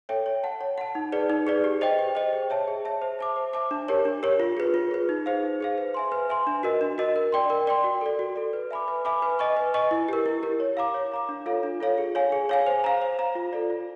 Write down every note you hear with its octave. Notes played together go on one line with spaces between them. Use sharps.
A4 C#5 E5 G5
C#5
F#5 A5
C#5
F#5 A5
D#4
G#4 B4 D5
D#4
G#4 B4 D5
G4
C5 D#5 G5
G4
C5 D#5 G5
G#4
C#5 E5 A5
G#4
C#5 E5 A5
C5
E5 A5 D6
C5
E5 A5 D6
D4
G4 A#4 C#5
D4
G4 A#4 C#5
F4
G#4 B4
F4
G#4 B4
D#4
G#4 C5 F5
D#4
G#4 C5 F5
B4
E5 G#5 C6
B4
E5 G#5 C6
D4
F#4 A#4 D#5
D4
F#4 A#4 D#5
A#4
D5 G5 C6
A#4
D5 G5 C6
F#4
A4 D5
F#4
A4 D5
B4
E5 G#5 B5 D6
B4
E5 G#5 B5 D6
B4
D#5 G#5 C#6
B4
D#5 G#5 C#6
E4
G4 A#4
E4
G4 A#4
C#5
F5 A#5 D6
C#5
F5 A#5 D6
D4
F4 A4 C#5 F5
D4
F4 A4 C#5 F5
G#4
C#5 F5 G#5
G#4
C#5 F5 G#5
C5
F5 A#5
C5
F5 A#5
F4
A4 D5
F4